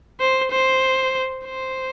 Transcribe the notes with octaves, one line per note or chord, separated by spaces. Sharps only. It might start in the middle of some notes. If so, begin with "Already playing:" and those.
C5
C5
C5